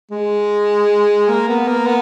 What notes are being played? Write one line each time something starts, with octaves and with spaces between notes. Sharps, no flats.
G#3
A#3
B3
A#3
B3